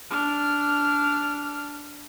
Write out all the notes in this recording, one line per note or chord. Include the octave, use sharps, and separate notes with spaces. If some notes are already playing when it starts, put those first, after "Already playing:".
D4 F6